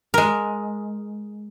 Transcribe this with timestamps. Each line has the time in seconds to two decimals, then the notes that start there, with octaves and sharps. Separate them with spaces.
0.14 G#3 A#4